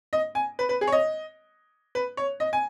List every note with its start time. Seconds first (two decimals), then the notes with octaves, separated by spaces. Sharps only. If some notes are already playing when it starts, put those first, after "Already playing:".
0.13 D#5
0.35 G#5
0.59 B4
0.69 B4
0.81 G#4
0.87 C#5
0.92 D#5
1.95 B4
2.17 C#5
2.40 D#5
2.53 G#5